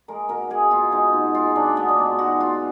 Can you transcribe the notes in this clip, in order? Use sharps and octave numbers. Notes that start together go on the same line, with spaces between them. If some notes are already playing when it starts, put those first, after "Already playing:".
G#3 A#4
B2 A#4
G#3 G#4
B2 F4
G#3 D#4
B2
G#3 F4
B2 D4
G#3 B3
D4
B2 D#4
G#3 F#4
B2 F4